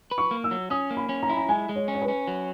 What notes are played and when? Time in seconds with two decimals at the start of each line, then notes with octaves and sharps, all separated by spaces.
0.11 B4
0.18 C#6
0.31 A#3
0.44 E6
0.51 F#3
0.70 C#4 D#6
0.91 A#3
0.97 B5
1.09 C#4
1.23 A#5
1.29 E4 B5
1.37 A#5
1.49 G#3 G#5
1.69 G#3
1.76 C#5
1.88 C#4
1.95 C#5
2.02 B4
2.08 C#4
2.27 F#3